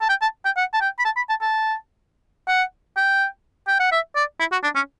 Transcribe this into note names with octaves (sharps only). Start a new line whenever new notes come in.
A5
G5
A5
G5
F#5
A5
G5
B5
A5
B5
A5
A5
F#5
G5
G5
F#5
E5
D5
E4
F#4
D4
C#4